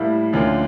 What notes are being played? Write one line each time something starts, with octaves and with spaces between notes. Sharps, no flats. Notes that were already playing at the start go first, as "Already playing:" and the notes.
Already playing: A2 G3 A#3 E4
D2 D3 F3 A#3 C#4